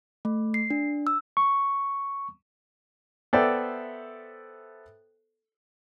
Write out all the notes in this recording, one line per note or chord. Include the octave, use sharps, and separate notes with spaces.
A3
C7
D4
E6
C#6
B3 A4 C5 D5 E5 G5